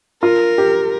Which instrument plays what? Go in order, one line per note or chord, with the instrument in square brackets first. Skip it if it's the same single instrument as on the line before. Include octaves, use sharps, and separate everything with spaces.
[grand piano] F4 [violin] A#4
[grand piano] G4